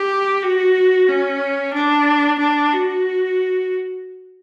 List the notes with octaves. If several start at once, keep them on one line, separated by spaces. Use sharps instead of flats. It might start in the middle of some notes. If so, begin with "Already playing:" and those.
Already playing: G4
F#4
C#4
D4
D4
F#4